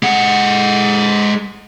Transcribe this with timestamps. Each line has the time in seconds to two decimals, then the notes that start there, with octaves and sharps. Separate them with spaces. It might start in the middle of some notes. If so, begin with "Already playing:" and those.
0.03 G#3 F#5